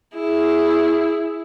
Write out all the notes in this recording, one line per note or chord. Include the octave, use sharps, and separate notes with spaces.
E4 G#4